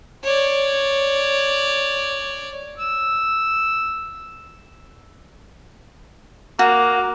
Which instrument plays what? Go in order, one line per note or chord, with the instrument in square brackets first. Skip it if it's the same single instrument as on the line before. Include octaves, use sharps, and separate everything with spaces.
[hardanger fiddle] C#5 D5
[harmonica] E6
[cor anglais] A#3 [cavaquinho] F#4